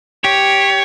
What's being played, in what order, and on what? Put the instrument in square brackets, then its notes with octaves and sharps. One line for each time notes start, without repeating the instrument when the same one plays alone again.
[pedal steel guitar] G4 [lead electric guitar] C#5